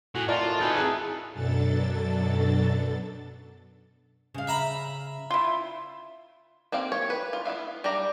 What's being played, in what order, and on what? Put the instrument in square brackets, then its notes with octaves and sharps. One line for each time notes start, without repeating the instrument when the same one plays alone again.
[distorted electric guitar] A2 [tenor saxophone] F#4 [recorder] G#5
[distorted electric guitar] F4 [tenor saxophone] A#4 [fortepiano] D5 [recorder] A5
[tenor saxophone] A2
[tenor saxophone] D#4 [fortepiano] F#4 [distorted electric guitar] A4 B4 [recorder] G#5
[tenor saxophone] E4 [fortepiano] G#4 A5 F#6
[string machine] F#2 B2 F#3 D4 A4 A6
[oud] C#3 F5
[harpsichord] E5 A#5 B5
[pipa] E4 F4
[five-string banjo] A#3 C4 G4 F5
C#5
B4
F4
B3 E4 E5 F5
G3 D4 G4 A#5